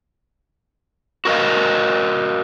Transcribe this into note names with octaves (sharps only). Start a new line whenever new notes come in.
F#4 A#4 D#5 F5